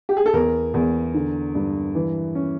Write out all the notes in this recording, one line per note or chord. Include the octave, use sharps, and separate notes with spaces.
G4
G#4
A4
E2 A#4
E2
D3
G2
E3
C#4